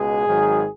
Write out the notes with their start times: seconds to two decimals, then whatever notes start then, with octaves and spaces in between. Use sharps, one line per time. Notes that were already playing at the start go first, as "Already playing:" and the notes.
Already playing: C#2 B2 G#3 G#4
0.27 G#1 G#2 D#3 F#3